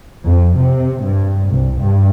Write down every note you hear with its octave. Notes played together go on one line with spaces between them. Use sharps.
F2
C3
G2
C2
G2